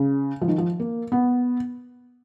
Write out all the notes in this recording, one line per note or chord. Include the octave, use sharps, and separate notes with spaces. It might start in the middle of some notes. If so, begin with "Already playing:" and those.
Already playing: C#3
F3
D#3
F3
A#3
B3